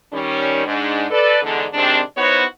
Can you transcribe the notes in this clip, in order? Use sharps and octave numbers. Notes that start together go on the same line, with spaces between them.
D#3 G3 C#4
G#2 D4
A4 B4 D5
E2 G#2 D3
C3 D#3 G#3 C4 D4
B3 D#4 E4 F#4 C5 C#5